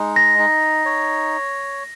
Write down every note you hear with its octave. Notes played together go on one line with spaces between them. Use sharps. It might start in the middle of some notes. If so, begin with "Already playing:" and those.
Already playing: G#3 D#4
A#6
D#4
C#5